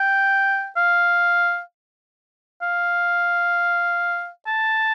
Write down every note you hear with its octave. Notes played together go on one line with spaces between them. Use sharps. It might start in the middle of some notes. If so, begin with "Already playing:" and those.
Already playing: G5
F5
F5
A5